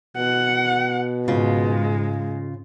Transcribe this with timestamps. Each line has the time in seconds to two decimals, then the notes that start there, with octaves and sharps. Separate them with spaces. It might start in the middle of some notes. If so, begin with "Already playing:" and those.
0.17 B2 F#5
1.28 G#2 C#3 G#3 F4